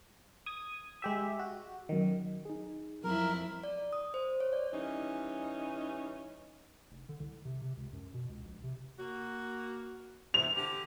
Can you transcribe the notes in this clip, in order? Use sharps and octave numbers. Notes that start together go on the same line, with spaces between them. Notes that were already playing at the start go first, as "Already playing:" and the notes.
D#6 G#6
G#3 G4 E5
F#4
F#2 D#3
D#4 G#4
F2 F#3 G3 E4 A#4
D5
D#6
C5
C#5
D5
E3 G3 C#4 D#4
F1
D3
C2
C3
C3
C#2
F#2
B2
C#2
A#1
C3
A#3 F#4
E2 C3 F7
D3 G4